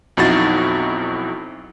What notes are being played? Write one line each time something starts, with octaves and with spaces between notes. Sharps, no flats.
B1 F2 D#4 E4 F#4 A6